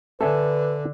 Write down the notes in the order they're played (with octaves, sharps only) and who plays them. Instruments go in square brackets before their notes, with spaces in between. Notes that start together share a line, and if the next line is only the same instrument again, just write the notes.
[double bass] D3 [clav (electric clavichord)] A4 E5 G#5 [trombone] B4